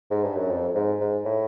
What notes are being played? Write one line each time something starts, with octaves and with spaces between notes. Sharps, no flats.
G#2
G2
F#2
F2
G#2
G#2
A2